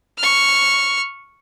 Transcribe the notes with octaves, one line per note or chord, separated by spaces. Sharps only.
C#6 F6